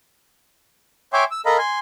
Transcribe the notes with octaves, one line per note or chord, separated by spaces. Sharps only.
C#5 E5 G5 G#5 C6 D6
E6
A4 A#4 D#5 F5 A#5 B5
G#5 C6